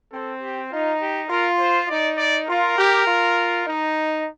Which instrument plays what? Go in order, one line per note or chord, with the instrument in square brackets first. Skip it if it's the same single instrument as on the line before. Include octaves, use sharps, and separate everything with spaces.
[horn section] C4 [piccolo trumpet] A4
[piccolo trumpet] G4
[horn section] D#4 [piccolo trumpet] F4
[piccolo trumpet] G4
[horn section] F4 [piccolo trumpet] A#4
[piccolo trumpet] C5
[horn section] D#4 [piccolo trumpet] D5
[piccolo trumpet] D5
[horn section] F4 [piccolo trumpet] A#4
[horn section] G4
F4
D#4